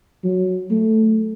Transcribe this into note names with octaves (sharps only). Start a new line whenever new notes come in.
F#3
A3